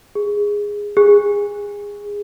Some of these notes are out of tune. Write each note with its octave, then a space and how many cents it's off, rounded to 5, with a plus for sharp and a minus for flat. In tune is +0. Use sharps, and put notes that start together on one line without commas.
G#4 -10
G#4 -20